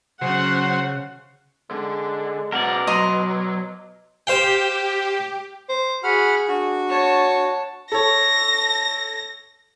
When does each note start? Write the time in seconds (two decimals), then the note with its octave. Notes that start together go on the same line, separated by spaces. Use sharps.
0.21 C#3 F#3 C#4 C5 F#5
1.71 D3 G#3
2.52 C#2 B2 A#4 D5 F#5
2.87 F#3 D#5 A#5 C6
4.27 G4 C5 F5 G5
5.69 C5
6.04 F#4 G#4 F#5 B5 F6
6.48 D4 F#4
6.88 C#5 A5
7.92 A4 C#5 A#6